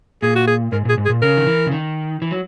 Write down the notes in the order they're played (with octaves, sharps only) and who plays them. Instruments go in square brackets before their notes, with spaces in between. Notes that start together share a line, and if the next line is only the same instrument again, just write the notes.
[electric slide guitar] A#2 [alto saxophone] G#4
[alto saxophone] F#4
G#4
[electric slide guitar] G#2 [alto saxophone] A#4
[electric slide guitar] A#2 [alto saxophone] G#4
[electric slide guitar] G#2
[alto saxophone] G#4
[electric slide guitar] A#2
[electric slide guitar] C#3 [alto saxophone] A#4
[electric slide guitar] D#3
E3
C#3
D#3
E3
F#3